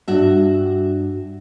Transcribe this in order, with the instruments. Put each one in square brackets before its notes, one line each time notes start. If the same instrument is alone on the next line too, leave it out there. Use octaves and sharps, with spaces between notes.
[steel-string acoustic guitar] G2 F#4 E5